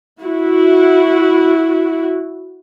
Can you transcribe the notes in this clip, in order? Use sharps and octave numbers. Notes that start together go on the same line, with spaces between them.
E4 F#4